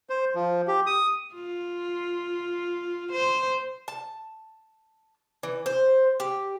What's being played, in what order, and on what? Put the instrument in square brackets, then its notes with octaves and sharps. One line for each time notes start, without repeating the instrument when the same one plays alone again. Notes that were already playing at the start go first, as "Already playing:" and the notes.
[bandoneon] C5
F3
G4
D#6
[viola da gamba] F4
C5
[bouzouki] A5
E3
C5
G4